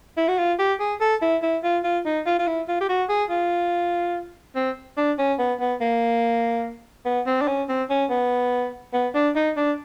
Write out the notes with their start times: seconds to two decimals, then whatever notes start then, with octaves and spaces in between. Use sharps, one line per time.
0.17 E4
0.28 F#4
0.38 F4
0.59 G4
0.80 G#4
1.01 A4
1.22 E4
1.43 E4
1.63 F4
1.84 F4
2.05 D#4
2.26 F4
2.39 F4
2.47 E4
2.68 F4
2.81 G4
2.89 F#4
3.09 G#4
3.30 F4
4.55 C4
4.97 D4
5.18 C#4
5.39 B3
5.60 B3
5.81 A#3
7.05 B3
7.27 C4
7.41 D4
7.48 C#4
7.68 C4
7.90 C#4
8.10 B3
8.93 B3
9.15 D4
9.36 D#4
9.57 D4